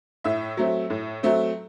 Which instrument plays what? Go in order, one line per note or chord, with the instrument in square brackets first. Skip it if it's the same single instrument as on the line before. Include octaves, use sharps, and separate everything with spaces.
[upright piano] A2 E5
F#3 A3 C4
A2
F#3 A3 C4